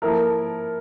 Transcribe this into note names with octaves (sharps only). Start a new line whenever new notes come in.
F3 A#3 E4 A4 A#4